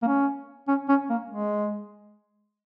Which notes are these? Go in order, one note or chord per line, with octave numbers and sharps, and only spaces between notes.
A#3
C#4
C#4
C#4
A#3
G#3